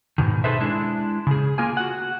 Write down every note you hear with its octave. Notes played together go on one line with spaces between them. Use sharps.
G#2 B2 D#3
D#4 G#4 A4 B4 C5 E5
G#3 D4 E4
C#3 G#4
A#3 F4 G#4 G#5
F#4 F#5